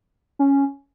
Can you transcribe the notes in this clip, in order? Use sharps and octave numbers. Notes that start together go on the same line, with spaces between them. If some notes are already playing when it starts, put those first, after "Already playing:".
C#4